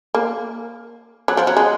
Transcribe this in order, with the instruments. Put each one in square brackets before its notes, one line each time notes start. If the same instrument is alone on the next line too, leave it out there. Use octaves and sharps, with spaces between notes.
[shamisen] A#3
F#3
F3
F#3
G#3